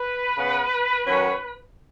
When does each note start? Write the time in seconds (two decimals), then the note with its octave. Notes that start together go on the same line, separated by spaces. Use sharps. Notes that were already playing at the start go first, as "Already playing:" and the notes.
Already playing: B4
0.35 C#3 B3
1.05 F#2 D#3 F#3 C#4